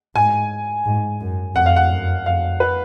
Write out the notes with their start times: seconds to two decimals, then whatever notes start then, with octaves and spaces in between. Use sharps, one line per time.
0.15 G#2 G#5
0.86 G#2
1.20 F#2
1.55 F2 F#5
1.66 F5
1.76 F#5
1.90 F#2
2.26 F2 F5
2.60 B4